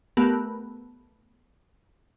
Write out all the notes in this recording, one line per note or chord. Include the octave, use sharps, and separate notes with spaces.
A3 B3 G4 A#4